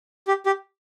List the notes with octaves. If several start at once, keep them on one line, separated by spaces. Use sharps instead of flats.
G4
G4